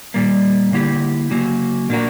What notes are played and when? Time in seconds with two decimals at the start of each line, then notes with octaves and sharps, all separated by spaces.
0.14 A#2 G3 A#3
0.73 D3 A#3 E4 G4
1.31 C#3 F#3 A#3
1.90 A#2 A#3 D4 F#4 A#4